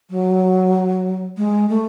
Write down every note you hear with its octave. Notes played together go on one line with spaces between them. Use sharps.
F#3
G#3
A3